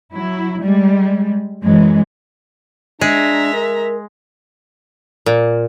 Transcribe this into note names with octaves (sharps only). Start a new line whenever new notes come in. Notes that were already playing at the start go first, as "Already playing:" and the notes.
F#3 E4
G3 G#3
F#2 E3 G#3
G#3 D4 G#4 E5 A#5
A#4
A#2